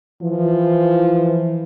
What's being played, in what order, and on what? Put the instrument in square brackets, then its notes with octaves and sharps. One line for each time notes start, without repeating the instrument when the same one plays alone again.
[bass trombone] E3 [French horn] F3